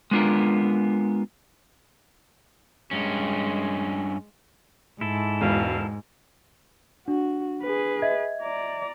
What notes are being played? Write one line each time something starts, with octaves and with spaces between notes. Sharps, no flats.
G#3 B3 D4 F4 A#4
G2 G#3 C#4
G#2 E4 A4
E1 B2 F5
D4 F#4
G#4 B4
D#5 E5 G#6
D5 A#5